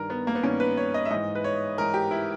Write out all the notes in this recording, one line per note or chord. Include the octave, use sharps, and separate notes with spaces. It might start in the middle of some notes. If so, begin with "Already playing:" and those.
Already playing: G2 D#3 A#4
B3
A#3
B3
G2 D#3 C#4
B4
C#5
D#5
E5
G#2 E3 D#5
B4
C#5
G#2 E3 A#4
G4
E4